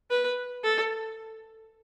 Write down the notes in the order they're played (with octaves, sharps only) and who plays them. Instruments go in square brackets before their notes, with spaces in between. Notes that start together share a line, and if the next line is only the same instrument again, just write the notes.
[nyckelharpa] B4
A4